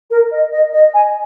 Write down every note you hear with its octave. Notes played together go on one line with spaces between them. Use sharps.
A#4
D#5
D#5
D#5
G#5